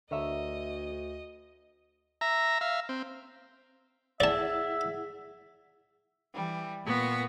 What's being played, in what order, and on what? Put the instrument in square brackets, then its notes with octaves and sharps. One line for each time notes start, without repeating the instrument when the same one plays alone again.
[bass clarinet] D2 [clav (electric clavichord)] D3 [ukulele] A#4 C#5 E5 [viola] D#5
[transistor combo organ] E5 A#5
E5 F5
C4
[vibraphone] E4 G#4 F#5 [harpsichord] D5 A5 [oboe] E5
[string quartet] E3 G3
A#2 A#3 B3 C#6 A#6